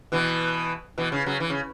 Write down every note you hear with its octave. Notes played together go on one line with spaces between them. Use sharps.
B2 E3
B2 E3
C#3
C#3 F#3
E3
C#3